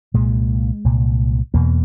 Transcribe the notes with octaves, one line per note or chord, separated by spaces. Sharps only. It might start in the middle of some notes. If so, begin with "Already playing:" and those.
C2 A#2 G#3
C2 A#2
E2 B2 A#3